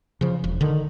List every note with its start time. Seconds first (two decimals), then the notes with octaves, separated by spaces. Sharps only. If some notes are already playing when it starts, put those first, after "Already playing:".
0.21 C#3 F3
0.44 E1
0.61 D3 D#3